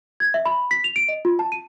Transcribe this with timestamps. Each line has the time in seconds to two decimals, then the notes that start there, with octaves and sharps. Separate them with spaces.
0.20 G#6
0.34 E5
0.46 B5
0.71 B6
0.84 F7
0.96 D7
1.08 D#5
1.25 F4
1.39 A5
1.52 D#7